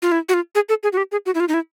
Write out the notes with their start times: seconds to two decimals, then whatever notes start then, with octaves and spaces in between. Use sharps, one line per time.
0.02 F4
0.12 E4
0.29 F#4
0.34 F4
0.55 G#4
0.69 A4
0.83 G#4
0.93 F#4
0.97 G4
1.12 G#4
1.26 F#4
1.35 E4
1.40 F4
1.48 D#4
1.54 E4